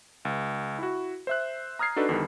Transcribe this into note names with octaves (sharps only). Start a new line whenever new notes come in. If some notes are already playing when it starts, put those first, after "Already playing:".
C#2
E4 F#4
C5 E5 F#6
A#5 D#6 F6 G#6 C7
D4 D#4 F#4 A4 B4
E2 D3 D#3 G3